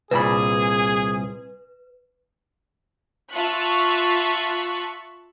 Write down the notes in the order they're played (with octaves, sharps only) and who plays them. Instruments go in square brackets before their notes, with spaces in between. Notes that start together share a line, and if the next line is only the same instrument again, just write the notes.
[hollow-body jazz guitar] C2 A#2 B5 [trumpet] G#4 [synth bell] B4
[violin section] F4 E5 A5 C#6 F#6 B6